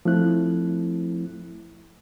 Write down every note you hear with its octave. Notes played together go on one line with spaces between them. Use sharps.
F3 A3 C4 E4 F#6